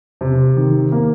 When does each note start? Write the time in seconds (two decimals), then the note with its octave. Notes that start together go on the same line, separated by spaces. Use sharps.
0.21 C3
0.57 D#3
0.92 A#3